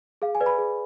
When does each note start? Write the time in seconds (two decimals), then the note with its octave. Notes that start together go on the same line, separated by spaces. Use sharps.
0.22 G#4 F5
0.35 G#5
0.41 B4 D5
0.46 B5
0.58 G#4